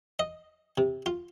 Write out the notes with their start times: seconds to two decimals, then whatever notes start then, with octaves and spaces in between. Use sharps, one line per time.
0.19 D#5
0.78 C3
1.06 F4